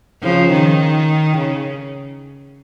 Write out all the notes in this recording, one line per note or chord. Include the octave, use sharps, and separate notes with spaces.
C#3 F3
D#3
C#3